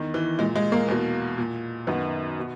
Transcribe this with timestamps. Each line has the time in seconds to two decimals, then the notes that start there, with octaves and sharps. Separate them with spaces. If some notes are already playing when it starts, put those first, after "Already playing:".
Already playing: E2 D#3
0.14 E3
0.39 A#2 G#3
0.56 G#3
0.72 A#3
0.88 E2 B2
1.38 A#2
1.87 F#2 D#3 B3
2.39 B2